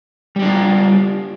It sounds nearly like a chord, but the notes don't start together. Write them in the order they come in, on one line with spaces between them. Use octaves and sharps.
G3 G4 D4 F4